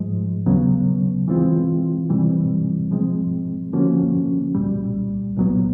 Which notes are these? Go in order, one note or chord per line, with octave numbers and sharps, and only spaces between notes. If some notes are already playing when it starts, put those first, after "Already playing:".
Already playing: G#2 F3 G#3
D#2 C#3 F#3 B3
E3 G#3 C4 F4
C3 E3 G3 C4
F3 G#3 C4
D3 F3 A#3 C#4 F#4
C2 A#2 G3
C2 A#2 F#3 B3